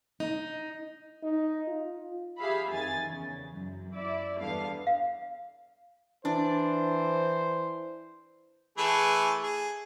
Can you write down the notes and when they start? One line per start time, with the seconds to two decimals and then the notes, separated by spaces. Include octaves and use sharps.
0.20 D#4
1.23 D#4
1.67 F4
2.39 G4 G#4 E5 F5 B5
2.71 F2 D#3 G#5 A6
3.03 E2 C#3
3.51 F#2
3.92 E4 D5 E5
4.39 E2 G2 D3 B3 F5
4.87 F5
6.25 E3 D4 C5
8.78 E3 A3 G#4
9.44 G#4